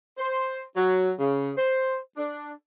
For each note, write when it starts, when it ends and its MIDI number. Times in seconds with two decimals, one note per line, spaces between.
0.18 0.61 72
0.76 1.11 54
1.19 1.51 49
1.57 1.97 72
2.17 2.52 62